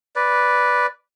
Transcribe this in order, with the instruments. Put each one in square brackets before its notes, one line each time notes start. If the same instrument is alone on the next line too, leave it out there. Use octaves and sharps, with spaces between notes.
[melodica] B4 D5